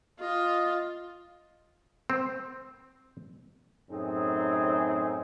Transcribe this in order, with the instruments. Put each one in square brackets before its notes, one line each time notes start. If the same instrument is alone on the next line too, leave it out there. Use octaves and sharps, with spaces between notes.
[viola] F4 [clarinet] D#5
[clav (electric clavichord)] C4
[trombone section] F#2 A2 C4 D#4 G#4